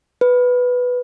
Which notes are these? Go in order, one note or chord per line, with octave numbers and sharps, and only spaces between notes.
B4